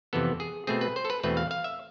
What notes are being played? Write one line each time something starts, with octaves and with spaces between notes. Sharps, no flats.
F2 C3 E3 B3 A4
G#4
B2 A3 C4 G#4
B4
C5
A4
B4
E2 B2 A3 C4 B4
F5
F5
E5